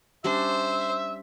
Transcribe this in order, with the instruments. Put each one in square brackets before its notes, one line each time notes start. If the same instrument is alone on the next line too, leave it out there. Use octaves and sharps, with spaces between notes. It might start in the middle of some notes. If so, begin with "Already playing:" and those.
[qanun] G3 C#4 D4 [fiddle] C5 [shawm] E5